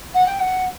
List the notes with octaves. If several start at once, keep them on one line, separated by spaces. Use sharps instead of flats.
F#5
G5
F#5